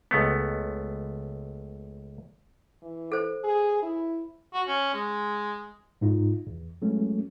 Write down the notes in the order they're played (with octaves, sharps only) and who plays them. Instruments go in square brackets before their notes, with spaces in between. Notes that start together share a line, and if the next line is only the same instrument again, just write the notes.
[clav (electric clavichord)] C#2 A3 B3
[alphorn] E3
[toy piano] A4 C5
[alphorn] G#4
E4
[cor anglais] F#4
C#4
G#3
[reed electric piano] G#2 D#4 F4
E2
F#3 G#3 A3 C#4